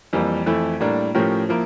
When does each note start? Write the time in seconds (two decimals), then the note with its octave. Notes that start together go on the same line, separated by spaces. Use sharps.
0.13 F2 E3 G3 A#3
0.46 F2 E3 A3 E4
0.80 A2 G3 A#3 D4
1.15 A2 F3 C#4 G4 A#4
1.49 F3 A#3 E4